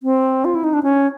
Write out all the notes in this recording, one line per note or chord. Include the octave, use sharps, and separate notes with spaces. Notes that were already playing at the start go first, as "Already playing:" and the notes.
C4
F4
E4
D#4
D4
C#4